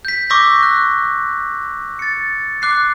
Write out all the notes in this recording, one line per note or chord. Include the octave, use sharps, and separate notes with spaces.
G6 B6
C#6 D6 E6 G6 A#6 B6
F#6
A6 C#7
D6 F#6 C7